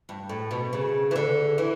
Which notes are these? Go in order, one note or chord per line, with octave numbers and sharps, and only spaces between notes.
G2
A2
B2
C#3
E3
D3
E3